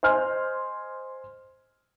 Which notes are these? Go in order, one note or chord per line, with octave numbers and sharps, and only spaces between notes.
C5 D#5 G#5 C6 F6 G6